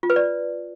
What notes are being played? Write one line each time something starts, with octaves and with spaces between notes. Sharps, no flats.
F4
B4
D5